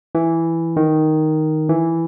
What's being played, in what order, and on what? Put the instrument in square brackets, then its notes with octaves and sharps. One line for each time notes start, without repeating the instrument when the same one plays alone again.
[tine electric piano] E3
D#3
E3